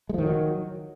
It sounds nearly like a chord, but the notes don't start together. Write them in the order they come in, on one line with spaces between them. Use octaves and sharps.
G#3 F3 D#3 F#3